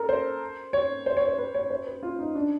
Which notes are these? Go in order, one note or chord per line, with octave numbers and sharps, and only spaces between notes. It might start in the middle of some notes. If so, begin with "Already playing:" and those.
Already playing: A4 A#4
C5
C#5
C5
C#5
C5
B4
C#5
C5
B4
F4
D#4
D4